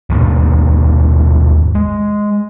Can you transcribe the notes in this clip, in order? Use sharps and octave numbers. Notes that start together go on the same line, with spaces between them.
D#2 G#2 B2
G#3